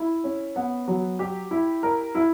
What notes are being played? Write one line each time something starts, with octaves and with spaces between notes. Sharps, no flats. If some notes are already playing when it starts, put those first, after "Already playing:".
Already playing: E4
C#4
B3
F#3
G4
E4
A#4
E4